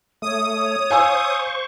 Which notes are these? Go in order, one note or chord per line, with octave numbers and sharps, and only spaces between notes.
A3 C#5 D#6
C5 F5 G#5 C#6 E6